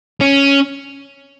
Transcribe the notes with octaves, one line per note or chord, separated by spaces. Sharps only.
C#4